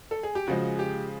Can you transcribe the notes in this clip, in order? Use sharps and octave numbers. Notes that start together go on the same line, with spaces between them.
A4
G#4
G4
C#3 F3 G#3 F#4
G4